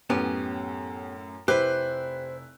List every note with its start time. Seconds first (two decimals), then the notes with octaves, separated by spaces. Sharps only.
0.10 F#2 A2 B3 C#4 G4
1.48 F1 E4 G4 B4 C5 F#6